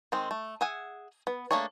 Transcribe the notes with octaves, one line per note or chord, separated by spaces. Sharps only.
D#3 G#3 C4
A3
G#4 E5 F#5 G#5
B3
A3 A#3 D4 G#4 C#5